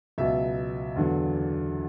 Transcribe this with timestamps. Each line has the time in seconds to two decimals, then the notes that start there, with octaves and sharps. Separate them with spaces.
0.18 C#2 B2 F#3 E5
0.96 E2 D3 F#3